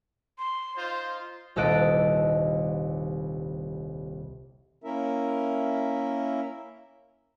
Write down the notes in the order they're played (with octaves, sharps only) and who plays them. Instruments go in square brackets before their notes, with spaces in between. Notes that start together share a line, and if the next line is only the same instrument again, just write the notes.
[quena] C6
[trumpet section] D#4 F4 C5
[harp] D#1 C2 A4 D#5 F#6 D7
[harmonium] A#3 C#4 E4 A#4 E5